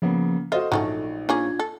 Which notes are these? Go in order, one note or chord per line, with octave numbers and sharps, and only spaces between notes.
C#3 F3 A#3 B3
F4 F#4 A4 C5 D#5
A#1 F#3 A3 C#4 D#4
A#3 C#4 D4 F4 G#4 G#6
A4